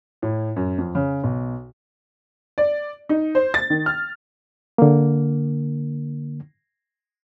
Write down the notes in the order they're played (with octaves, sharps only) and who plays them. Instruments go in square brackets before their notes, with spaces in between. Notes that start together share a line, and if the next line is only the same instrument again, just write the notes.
[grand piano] A2
F#2
F2
C#3
B1
[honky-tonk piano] D5
D#4
C5
A6
D#3
F6
[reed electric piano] D3 A#3